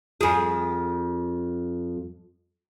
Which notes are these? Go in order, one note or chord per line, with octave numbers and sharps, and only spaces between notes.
F2 G#4